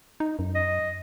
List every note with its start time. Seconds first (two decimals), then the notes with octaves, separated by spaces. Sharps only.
0.20 D#4
0.39 F#2
0.55 D#5